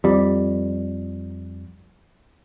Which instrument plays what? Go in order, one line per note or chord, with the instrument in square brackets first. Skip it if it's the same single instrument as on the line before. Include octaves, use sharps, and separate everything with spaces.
[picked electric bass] F2 G3